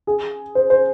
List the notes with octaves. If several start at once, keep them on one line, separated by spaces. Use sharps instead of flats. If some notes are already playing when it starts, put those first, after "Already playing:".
G#4
C5
C5